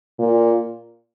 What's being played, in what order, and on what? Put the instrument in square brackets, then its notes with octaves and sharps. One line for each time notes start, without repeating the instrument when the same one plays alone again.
[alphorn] A#2